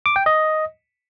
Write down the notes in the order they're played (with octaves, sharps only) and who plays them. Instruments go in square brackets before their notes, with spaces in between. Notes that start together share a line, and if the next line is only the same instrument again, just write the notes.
[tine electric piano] D6
G5
D#5